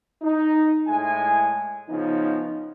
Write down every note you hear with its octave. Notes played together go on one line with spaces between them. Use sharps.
D#4
A2 G#3 E4 G#5
C#3 F3 B3 C#4 D#4